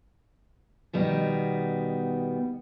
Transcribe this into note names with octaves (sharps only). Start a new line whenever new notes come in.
B2 D#3 G3 B3